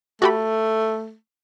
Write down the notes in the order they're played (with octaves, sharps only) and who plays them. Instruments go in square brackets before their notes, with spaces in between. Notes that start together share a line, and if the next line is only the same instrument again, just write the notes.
[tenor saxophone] A3 [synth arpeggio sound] F#4 G4 B5